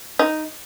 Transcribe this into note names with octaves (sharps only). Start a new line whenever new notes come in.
D#4